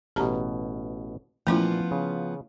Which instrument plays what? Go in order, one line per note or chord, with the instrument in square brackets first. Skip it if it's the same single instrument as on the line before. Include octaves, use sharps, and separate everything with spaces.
[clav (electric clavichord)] A1 B2 [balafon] G4 A5 A#5
[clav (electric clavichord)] A#2 E3 [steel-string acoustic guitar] F3 B3 F4 [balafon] A3 C#4 E4
[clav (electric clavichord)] C#3